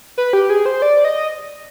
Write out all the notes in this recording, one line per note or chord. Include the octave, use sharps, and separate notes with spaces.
B4
G4
G#4
C5
D5
D#5